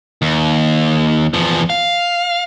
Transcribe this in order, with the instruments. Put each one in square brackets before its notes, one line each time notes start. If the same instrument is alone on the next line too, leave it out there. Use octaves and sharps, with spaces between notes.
[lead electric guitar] D#2
E2 F3
F5